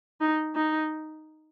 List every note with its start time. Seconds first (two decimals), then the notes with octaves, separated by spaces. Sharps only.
0.21 D#4
0.56 D#4